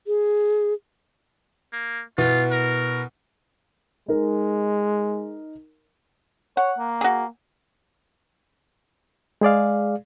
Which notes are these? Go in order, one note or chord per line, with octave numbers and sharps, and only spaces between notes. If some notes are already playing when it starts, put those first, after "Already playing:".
G#4
A#3
B2 B3 E4 F4
A#4
G#3 D#4 A#4
C#5 F#5
A#3
F#4 G#4
G#3 G#4 D5 F5